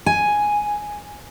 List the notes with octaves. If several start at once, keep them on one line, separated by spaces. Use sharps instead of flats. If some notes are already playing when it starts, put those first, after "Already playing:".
G#5